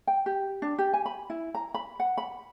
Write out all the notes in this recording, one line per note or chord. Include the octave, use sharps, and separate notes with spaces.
G5
G4
D4
G4
G#5
B5
E4
A#5
B5
F#5
B5